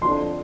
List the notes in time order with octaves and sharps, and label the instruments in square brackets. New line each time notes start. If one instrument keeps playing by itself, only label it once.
[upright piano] F2 D3 F3 D4 C6